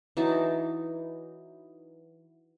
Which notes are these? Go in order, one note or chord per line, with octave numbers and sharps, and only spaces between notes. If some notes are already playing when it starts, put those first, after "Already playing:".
E3 F#3 D#4 A5